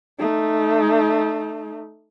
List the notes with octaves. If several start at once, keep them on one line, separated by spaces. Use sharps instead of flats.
A3 D#4